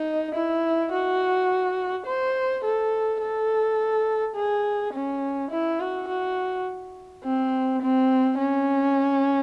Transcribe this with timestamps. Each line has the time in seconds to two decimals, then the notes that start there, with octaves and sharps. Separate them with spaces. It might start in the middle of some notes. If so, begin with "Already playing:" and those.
Already playing: D#4
0.35 E4
0.92 F#4
2.07 C5
2.65 A4
3.21 A4
4.36 G#4
4.94 C#4
5.51 E4
5.80 F#4
6.08 F#4
7.24 C4
7.82 C4
8.39 C#4